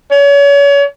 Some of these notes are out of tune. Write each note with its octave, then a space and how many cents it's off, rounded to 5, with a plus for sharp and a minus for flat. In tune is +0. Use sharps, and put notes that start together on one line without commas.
C#5 +35